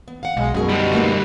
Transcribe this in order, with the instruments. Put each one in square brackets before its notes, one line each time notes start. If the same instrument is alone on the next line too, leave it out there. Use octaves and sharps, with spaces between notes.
[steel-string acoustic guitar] B3
F5 F#5
[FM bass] B1 [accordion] G#3
[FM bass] F#2 [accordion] B2 [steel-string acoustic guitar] G#3 G#4 A#4
[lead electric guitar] D2 G3 [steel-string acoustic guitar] D#4
[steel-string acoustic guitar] A3 A#3 D#4